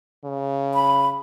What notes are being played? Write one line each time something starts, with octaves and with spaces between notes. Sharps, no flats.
C#3
B5